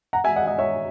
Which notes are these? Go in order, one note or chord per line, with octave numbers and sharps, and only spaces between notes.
F#5 A#5
E5 G#5
D#5 F#5
D#5 F#5
C#5 E5